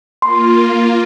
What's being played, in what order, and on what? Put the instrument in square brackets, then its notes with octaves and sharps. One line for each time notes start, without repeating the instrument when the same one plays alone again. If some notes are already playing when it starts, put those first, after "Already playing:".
[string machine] A#3 F4 [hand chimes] C6